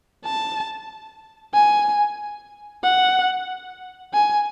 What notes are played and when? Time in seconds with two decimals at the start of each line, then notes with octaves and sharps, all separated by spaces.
0.24 A5
1.54 G#5
2.83 F#5
4.14 G#5